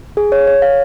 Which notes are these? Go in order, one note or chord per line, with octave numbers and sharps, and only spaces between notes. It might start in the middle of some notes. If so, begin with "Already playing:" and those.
G#4
C#5
C#5
F5